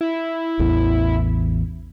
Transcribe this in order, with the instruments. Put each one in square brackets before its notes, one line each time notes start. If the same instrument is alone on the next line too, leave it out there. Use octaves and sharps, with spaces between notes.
[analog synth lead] E4
[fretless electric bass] A1 E2 E3